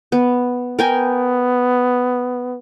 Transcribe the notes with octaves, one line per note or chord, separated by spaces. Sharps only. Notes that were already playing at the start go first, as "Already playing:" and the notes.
B3
B3 A#4 G5 G#5